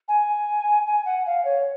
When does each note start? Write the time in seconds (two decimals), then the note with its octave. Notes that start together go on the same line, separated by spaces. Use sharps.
0.08 G#5
0.87 G#5
1.06 F#5
1.26 F5
1.45 C#5